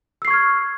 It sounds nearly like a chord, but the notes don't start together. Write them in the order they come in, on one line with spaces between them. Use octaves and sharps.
E6 C7 C#6 G#6 F6